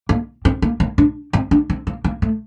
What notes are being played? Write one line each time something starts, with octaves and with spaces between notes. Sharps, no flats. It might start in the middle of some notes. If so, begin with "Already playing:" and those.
A#3
C4
A#3
A#3
D4
C4
D4
C4
A#3
A#3
A3